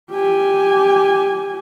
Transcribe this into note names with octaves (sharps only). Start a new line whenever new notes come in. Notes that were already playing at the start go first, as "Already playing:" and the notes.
G4 G#5